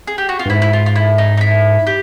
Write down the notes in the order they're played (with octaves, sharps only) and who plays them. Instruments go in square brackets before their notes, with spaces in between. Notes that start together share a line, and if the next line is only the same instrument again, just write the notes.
[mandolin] G#4
G4
F#4
F4
[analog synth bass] G2
[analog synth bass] G#2 [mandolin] E4
[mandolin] E4
F4
F4
E4
D#4
D#4
E4
G4